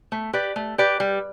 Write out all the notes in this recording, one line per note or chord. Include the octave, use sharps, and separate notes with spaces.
A3
G4 B4 D5
A3
G4 B4 D5
G3